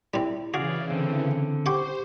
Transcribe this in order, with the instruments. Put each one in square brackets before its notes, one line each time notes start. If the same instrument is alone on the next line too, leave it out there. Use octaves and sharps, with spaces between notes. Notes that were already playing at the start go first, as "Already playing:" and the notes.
[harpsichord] G3 C4 [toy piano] E4 F4 E5
[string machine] C#3 E3 [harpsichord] F#4 [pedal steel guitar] G#4 D5 F5
[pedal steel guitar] D3 C4
[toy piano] G4 D6 [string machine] C5 [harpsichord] F#5 G5 C6